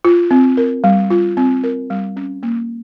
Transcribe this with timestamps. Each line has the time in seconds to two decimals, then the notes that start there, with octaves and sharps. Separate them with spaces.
0.05 F4
0.31 C4
0.57 A#4
0.84 G3
1.10 F4
1.37 C4
1.64 A#4
1.90 G3
2.17 C#4
2.43 A#3